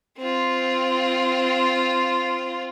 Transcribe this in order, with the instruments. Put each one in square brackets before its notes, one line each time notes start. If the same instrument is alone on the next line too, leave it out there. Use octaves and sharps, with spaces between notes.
[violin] C4 F4